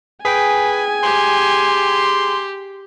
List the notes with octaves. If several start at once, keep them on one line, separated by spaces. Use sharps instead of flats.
G#4 B4 G5 G#5
G4 C6